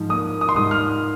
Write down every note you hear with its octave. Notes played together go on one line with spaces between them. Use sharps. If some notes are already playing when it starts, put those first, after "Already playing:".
Already playing: G#2 F3
A#3 D#6
D#6
C6
G#2 D#6
F6